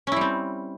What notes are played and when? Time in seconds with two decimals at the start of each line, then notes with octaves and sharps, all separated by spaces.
0.07 C#4
0.12 E4
0.16 G3
0.21 C4